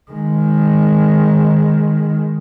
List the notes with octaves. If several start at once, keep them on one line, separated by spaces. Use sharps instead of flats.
D#3 G#3